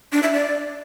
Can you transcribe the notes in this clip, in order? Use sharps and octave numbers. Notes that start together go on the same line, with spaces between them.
D4
E5
D5